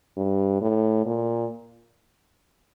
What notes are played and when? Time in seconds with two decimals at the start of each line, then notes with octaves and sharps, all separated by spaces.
0.17 G2
0.61 A2
1.06 A#2